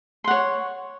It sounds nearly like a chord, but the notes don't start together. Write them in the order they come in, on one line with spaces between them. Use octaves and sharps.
C6 F#5 C#5